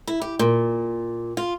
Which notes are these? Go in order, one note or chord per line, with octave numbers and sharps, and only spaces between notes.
E4
G4
A#2
F4